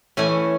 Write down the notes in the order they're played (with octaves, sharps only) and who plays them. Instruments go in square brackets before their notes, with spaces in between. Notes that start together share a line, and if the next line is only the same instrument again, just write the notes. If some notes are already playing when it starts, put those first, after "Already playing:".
[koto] E3 A3 C#4 G#5